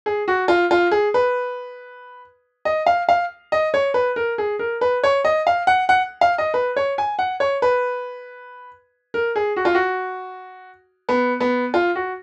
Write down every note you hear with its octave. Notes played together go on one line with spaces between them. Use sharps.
G#4
F#4
F4
F4
G#4
B4
D#5
F5
F5
D#5
C#5
B4
A#4
G#4
A#4
B4
C#5
D#5
F5
F#5
F#5
F5
D#5
B4
C#5
G#5
F#5
C#5
B4
A#4
G#4
F#4
F4
F#4
B3
B3
F4
F#4